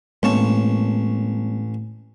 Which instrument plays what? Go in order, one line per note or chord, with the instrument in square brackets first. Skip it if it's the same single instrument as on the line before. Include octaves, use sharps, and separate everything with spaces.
[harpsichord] A1 C#5 A5 [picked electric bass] G#3 A#3 C4